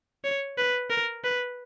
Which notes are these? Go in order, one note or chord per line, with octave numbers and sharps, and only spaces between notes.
C#5
B4
A#4
B4